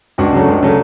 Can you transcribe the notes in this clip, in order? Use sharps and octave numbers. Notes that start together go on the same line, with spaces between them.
C#2 D4 F#4
C#3 F#3 A3
C#2
C#3 F#3 A3